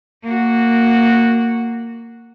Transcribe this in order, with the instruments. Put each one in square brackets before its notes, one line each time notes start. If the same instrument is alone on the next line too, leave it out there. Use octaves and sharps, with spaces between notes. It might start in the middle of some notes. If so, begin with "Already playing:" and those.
[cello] A#3 F#4